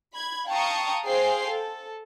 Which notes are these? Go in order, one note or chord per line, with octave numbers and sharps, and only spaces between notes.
B5 G#6
F5 G5 A5 A#5 C#6 D#6
G#4 C5 F5 G5 G#5 C7
A4